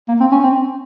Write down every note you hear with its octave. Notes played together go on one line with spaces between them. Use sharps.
A#3
C4
C#4
C4